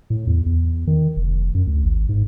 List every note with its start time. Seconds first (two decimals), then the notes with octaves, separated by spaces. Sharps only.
0.10 A2
0.27 E2
0.46 E2
0.87 D#3
1.16 F1
1.54 F#2
1.67 D2
1.84 G#1
2.09 G#2